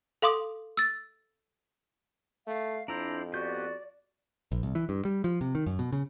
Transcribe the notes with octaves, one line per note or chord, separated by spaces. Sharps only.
A4 F5 C6 D6 D#6
E6 A6
A3 F5
F2 D4 E4 C5 A#5
B3 F#4 G4 D5 G6
A#1
C2
E3
G2
G3
F3
C3
D#3
F#2
B2
C#3